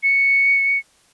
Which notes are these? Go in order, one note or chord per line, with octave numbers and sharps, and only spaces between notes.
C#7